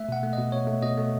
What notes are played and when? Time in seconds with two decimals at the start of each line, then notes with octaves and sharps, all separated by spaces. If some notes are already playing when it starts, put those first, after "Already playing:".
Already playing: A3 E5
0.09 B2 F#5
0.23 A3
0.33 B2 D#5
0.52 B2 C#5
0.67 A3
0.82 B2 D#5
0.98 A3